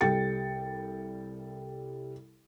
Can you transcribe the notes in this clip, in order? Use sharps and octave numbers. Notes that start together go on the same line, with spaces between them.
C2 G3 A4 G5 A6 C#7